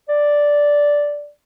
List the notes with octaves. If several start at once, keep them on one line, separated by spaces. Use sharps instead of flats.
D5